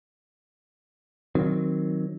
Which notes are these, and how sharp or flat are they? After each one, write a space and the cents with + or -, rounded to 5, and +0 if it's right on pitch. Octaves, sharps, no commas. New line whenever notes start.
D#3 +5 F#3 +0 C4 +0